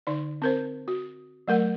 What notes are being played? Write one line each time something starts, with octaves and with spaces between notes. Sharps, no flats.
D3 D#4 D5
C4 A#4 C5
F#4
F#3 A3 A#4 F#5